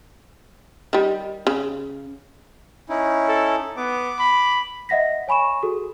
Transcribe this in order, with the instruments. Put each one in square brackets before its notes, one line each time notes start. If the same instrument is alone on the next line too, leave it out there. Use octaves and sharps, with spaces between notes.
[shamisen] D#3 G3
C#3
[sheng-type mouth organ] C#4 D#4 E4
[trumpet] A4
[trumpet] B3 [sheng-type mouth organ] D6
[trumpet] B5
[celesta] D#5 E5 F#5 A#6 B6
C#5 G#5 B5 C#6 E7
F#4 G#4 A4